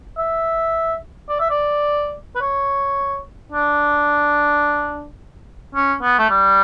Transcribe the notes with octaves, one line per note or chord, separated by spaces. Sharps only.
E5
D5
E5
D5
B4
C#5
D4
C#4
B3
A3
G3